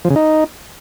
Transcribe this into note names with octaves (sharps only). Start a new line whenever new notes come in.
F3
C#3
D#4